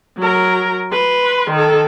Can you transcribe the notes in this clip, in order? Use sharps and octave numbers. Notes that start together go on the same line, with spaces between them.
F#3 A#4
B4 C6
D#3 A4